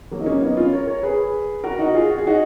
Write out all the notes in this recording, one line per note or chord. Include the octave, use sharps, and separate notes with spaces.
F#3 A#3
D#4
A#3 C#4
B3 D#4
C#4 F4
A#4 C#5
A#4 C#5
G#4 B4
F#4 A#4
D#4 F#4
F4 G#4
F#4
G#4
D#4 F#4